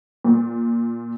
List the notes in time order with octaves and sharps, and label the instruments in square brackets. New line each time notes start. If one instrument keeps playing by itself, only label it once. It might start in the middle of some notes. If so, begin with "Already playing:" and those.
[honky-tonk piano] A#2